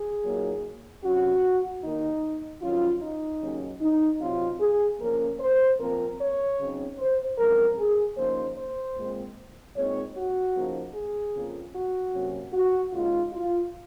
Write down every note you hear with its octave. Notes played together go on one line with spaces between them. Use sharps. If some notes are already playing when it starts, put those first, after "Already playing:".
Already playing: G#4
A#2 F#3 A#3 D#4
C3 F#3 C#4 F#4
D#2 D#3 A#3 D#4
F2 D#3 F#3 C#4 F4
D#4
D#2 C#3 F#3 C#4
D#4
C3 F#3 C4 D#4 F4
G#4
C#3 F3 A#3 C#4 A#4
C5
A#2 F3 C4 A#4
C#5
C#3 F#3 C4 D#4
C5
F#2 F3 G#3 C4 A#4
G#4
C#3 F3 A#3 D#4 C5
C5
A#2 G#3 C4
A#2 G#3 C4 D#4 C#5
F#4
C#3 F3 A#3 D#4
G#4
F2 C#3 F3 A#3
F#4
C3 F#3 A#3 C#4
F#4
D#2 C#3 G#3 D#4 F4
F4